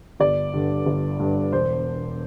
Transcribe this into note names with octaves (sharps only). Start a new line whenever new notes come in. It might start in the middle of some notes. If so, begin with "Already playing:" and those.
G1 D5
G2 D3
G1
G2 D3
E1 C5